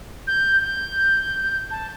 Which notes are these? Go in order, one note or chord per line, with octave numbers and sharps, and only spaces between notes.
G6
G6
A5